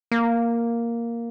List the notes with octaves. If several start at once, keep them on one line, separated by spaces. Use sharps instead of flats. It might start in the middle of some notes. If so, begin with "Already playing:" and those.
A#3